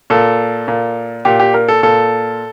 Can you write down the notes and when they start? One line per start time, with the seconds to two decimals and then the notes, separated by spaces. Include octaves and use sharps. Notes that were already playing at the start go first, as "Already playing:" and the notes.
0.10 A#2 A4
0.68 A#2
1.25 A#2 G4
1.40 G4
1.54 A#4
1.68 A4
1.83 A#2 A4